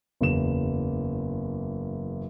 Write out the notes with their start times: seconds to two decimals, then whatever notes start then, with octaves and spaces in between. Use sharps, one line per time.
0.21 F#1 E2 E7